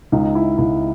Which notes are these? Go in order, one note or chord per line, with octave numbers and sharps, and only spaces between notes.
C#2 D#4
E4
C#2 E4